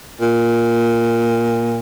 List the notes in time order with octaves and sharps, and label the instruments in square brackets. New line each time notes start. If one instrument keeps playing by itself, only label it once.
[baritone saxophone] A#2